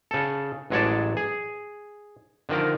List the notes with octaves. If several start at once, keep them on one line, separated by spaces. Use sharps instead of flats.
C#3 A4
A1 F#3 G#3 C#5 D5 A5
G#4
D3 D#3 F3 A#4